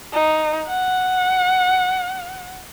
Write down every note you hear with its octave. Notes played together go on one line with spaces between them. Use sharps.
D#4
F#5